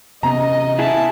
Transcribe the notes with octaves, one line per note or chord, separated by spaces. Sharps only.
C3 B3 C#4 D#5 A#5
E4 G#4 E5 A5